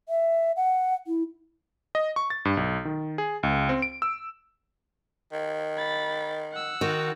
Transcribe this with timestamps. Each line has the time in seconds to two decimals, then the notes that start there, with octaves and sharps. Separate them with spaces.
0.09 E5
0.56 F#5
1.07 E4
1.95 D#5
2.16 C#6
2.30 A6
2.45 G2
2.57 B1
2.85 D#3
3.18 G#4
3.43 C#2
3.69 C4
3.82 D7
4.02 E6
5.32 D#3
5.78 B5 A6
6.52 F#5 E6
6.81 D#3 F#4